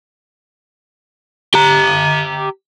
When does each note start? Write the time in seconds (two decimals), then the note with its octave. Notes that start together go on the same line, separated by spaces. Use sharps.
1.54 G4 A#5